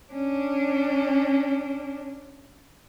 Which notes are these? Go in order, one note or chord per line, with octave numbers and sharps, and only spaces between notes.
C#4 D4